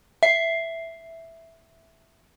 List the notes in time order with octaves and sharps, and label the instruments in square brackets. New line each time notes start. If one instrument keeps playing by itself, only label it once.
[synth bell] E5 C7